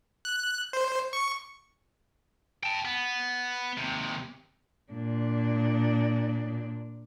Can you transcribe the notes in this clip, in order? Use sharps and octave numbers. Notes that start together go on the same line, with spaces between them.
F#6
C5
C#6
G5 A5
B3
D#2 C3
A#2 D4